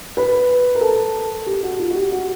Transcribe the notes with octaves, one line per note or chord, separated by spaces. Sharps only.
B4
A#4
A4
G4
F#4
F4
F#4
G4
F#4